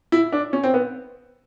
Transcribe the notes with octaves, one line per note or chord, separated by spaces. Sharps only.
E4
D4
C#4
C4
B3